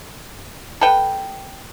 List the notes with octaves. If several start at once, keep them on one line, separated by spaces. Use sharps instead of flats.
A4 B4 G5